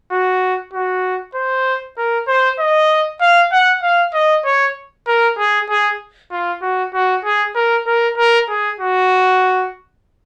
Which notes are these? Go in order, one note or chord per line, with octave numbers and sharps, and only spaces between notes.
F#4
F#4
C5
A#4
C5
D#5
F5
F#5
F5
D#5
C#5
A#4
G#4
G#4
F4
F#4
F#4
G#4
A#4
A#4
A#4
G#4
F#4